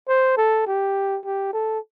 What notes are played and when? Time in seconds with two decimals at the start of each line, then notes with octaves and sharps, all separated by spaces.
0.08 C5
0.37 A4
0.67 G4
1.25 G4
1.53 A4